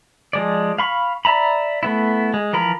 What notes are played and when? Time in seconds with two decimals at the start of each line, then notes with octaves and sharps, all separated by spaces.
0.33 F3 G#3 D5
0.78 F5 B5 C#6
1.25 D5 E5 A#5 B5
1.83 A3 B3 E4
2.34 G#3
2.53 E3 F3 A#4 B5